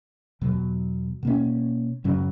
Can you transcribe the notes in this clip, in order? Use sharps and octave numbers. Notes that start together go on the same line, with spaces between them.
E2 B2 F#3
B2 A#3 C#4
F#2 C#3 F#3 C#4